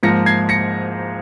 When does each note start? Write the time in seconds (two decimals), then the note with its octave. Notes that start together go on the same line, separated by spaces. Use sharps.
0.03 G#2 F3 A#3 A#6 C#7
0.26 G#6 C7
0.49 A#6 C#7